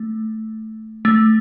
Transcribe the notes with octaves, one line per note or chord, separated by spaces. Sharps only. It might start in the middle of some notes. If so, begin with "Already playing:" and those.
Already playing: A3
A3